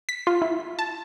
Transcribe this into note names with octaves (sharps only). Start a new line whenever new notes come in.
B6
F4
E4
A5